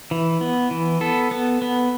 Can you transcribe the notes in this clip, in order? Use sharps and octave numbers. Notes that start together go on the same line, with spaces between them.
E3
B3
E3
B3 A4
B3
B3